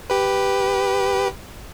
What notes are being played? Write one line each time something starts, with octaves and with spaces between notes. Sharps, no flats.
G4 B4